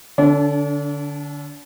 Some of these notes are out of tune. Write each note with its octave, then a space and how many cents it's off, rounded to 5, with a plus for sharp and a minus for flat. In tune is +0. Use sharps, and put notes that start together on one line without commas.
D3 +0 D4 -40